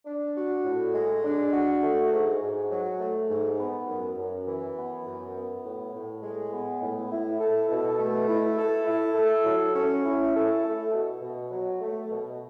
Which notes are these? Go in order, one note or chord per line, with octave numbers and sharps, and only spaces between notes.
D4
F#4
A2
G#3
D4
F#4
A3
G#2
G#2
F#3
A3
G#2
B3
F#2
F#2
E3
B3
F#2
B3
A2
A2
G#3
B3
A2
E4
A4
B2
A3
E4
A4
E4
A4
F#3
C#4
E4
A4
A3
B2
B2
F#3
A3
B2